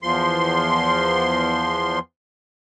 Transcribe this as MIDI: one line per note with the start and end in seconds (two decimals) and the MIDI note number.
0.03 1.99 40
0.03 1.99 53
0.03 1.99 84